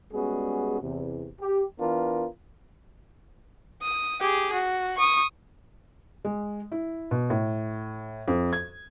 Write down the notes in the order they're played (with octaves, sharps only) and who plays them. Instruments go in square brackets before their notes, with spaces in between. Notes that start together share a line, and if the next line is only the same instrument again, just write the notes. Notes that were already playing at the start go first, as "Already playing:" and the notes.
[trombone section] G3 G#3 B3 C#4 F#4 G#4
E2 C3
G4
E3 B3 D4 F4 A#4
[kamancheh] D#6
G4 G#4
F#4
C#6 D#6
[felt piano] G#3
E4
B2
A2
F2
G#6